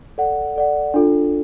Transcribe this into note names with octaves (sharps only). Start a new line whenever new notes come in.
A4 D5 F#5
A4 D5 F#5
D4 F4 A4